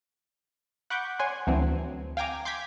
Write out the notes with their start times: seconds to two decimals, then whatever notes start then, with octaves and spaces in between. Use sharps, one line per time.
0.90 F#5 B5 C#6 D6 F#6 G6
1.19 C#5 F#5 G#5 C6
1.47 D2 E3 F#3 C4
2.17 F5 G5 G#5 A#5 D6
2.45 C6 D6 G6 G#6 B6 D7